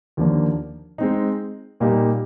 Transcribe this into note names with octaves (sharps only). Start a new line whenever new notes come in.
D#2 D3 F3 A#3 D4
G#3 C4 D#4
A#2 G3 A#3 D#4 G4